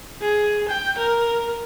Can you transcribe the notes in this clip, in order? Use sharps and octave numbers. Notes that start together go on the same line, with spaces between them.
G#4
G5
A#4